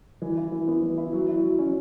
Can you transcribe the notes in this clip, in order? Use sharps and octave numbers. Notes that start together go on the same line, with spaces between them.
E3
E4
E3
B3
E3
E4
F#3
E4
F#3
C#4